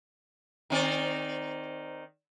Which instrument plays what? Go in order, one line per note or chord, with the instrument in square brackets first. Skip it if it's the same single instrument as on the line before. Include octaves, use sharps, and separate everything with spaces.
[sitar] D#3 C4 D5